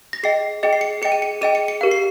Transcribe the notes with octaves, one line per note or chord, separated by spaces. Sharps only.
A#6
G#4 D#5 G5 C7
G#4 D#5 G5 C#7
C7
C#7
G#4 D#5 G5 C#7
D#7
C#7
G#4 D#5 G5 D#7
C#7
C#7
G4 A#4 F5
C7